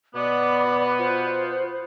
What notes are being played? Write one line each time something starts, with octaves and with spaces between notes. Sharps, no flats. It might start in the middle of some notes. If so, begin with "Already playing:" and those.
B2 B3 D5 B5 D6
F4 C5